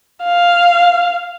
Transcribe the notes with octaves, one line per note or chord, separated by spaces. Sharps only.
F5